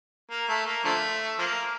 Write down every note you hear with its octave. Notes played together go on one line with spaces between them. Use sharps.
A#3
A3
A#3
D3 F3 A3
F3 A#3